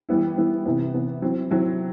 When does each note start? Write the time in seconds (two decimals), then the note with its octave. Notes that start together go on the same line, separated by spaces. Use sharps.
0.09 E3 G3 B3 E4
0.37 E3 G3 B3 E4
0.66 C3 E3 B3
0.94 C3 E3 B3
1.22 F#3 C4 E4
1.51 F#3 C4 E4